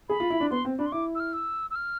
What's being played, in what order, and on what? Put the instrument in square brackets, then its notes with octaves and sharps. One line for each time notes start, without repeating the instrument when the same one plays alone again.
[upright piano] G#4 [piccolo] B5
[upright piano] F4
E4
D4
[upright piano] B3 [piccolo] C6
[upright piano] C4
[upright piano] D4 [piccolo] B5
[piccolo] C6
[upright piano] E4 [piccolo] D6
[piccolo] E6
F6
E6
E6
F6